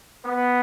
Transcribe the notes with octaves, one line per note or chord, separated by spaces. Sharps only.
B3